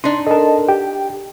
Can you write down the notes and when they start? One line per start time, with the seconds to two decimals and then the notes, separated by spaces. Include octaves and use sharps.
0.04 D4 D#4 C6
0.27 A4 A#4 D#5 A5
0.69 G4 G5